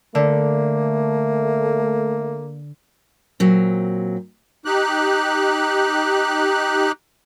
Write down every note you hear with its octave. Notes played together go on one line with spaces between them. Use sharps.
D3 A3 A#3
A#2 F#3 C4
D#4 G4 F#6